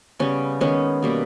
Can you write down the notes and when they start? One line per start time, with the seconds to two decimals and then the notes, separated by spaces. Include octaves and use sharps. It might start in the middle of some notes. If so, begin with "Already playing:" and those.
0.19 C#3 G3 B3 C#4
0.61 D#3 G#3 B3 C#4
1.02 B2 G3 A#3